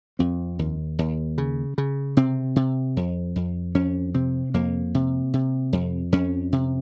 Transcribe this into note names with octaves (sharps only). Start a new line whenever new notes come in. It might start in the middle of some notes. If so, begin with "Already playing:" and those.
F2 C4
D#2
D#2
C#3
C#3
C3 C4
C3
F2
F2
F2 C#4
C3 C4
F2 A#3
C3
C3
F2
F2 C#4
C3